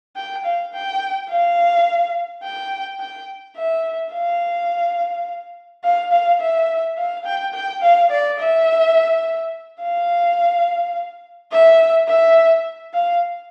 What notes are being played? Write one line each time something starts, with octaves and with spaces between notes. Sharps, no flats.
G5
F5
G5
F5
G5
G5
E5
F5
F5
F5
E5
F5
G5
G5
F5
D5
E5
F5
E5
E5
F5